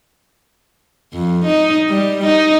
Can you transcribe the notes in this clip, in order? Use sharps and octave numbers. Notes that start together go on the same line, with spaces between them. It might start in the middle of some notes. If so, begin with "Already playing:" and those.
F2
D#4
G3
D#4